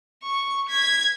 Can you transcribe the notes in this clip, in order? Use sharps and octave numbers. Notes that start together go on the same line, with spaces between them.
C#6
G#6 B6